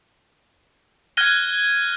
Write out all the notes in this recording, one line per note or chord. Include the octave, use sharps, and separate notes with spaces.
F6 F#6 G#6 A#6 D#7 G7